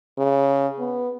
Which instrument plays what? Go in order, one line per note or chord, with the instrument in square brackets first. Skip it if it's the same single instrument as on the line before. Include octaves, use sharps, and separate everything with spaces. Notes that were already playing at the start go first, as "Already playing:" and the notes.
[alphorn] C#3
B3